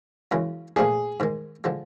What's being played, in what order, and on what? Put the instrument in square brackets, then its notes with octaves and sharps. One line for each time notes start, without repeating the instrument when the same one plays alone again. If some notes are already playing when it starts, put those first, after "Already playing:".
[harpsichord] F#2 C#3 E3 G#3
[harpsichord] A#2 F3 A3 D4 [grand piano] G#4
[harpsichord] G#2 D#3 G#3
D3 F3 G#3